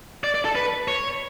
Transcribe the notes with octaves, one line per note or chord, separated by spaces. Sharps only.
D5
D5
A4
B4
C#5